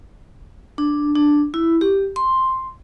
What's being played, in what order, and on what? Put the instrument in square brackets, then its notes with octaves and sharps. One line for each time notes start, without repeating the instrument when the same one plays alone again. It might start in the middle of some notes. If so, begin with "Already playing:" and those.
[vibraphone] D4
D4
E4
G4
C6